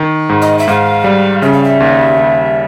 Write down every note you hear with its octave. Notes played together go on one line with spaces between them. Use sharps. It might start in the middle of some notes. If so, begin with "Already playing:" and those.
Already playing: D#3
G#2
D#5
E5
G#2 F5
G3
C#3 E5
F5
E5
D#2
D#2